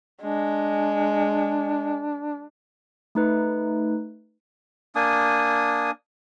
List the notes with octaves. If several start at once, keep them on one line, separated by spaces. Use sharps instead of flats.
G#3 D4
A3 D#4 B4
A#3 D4 G#5 D#6